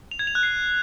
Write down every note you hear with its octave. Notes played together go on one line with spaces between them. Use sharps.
F7
G#6
F7
F#6
C7